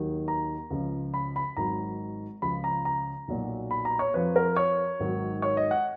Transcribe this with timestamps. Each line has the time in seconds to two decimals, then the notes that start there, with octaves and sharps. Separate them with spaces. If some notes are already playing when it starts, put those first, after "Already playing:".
Already playing: D#2 D#3 F#3
0.28 A#5
0.70 C#2 C#3 F3
1.14 B5
1.36 B5
1.57 G#1 G#2 D#3 F#3 A#5
2.42 C#2 C#3 F3 B5
2.64 A#5
2.85 A#5
3.28 B1 A#2 F#3
3.71 B5
3.85 A#5
3.99 C#5
4.14 F2 F3 B4
4.36 A#4
4.56 C#5
4.99 G#1 G#2 D#3 F#3
5.42 C#5
5.57 D#5
5.71 F#5